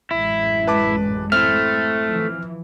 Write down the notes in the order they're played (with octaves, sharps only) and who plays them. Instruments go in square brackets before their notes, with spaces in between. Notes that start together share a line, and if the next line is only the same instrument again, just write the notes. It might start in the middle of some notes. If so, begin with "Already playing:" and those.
[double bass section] A1 F#2 G#3 [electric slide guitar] E4
[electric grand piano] B4 A5 D6
[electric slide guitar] A3 [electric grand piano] C4 E4 [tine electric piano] F6
[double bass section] E3 F3